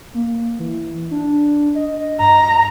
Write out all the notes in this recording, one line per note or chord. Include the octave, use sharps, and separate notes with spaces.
A#3
E3
D4
D#5
G2 A#5